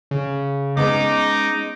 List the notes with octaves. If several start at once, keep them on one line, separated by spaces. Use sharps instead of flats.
C#3
G#3 B3 C#4 D#4 D6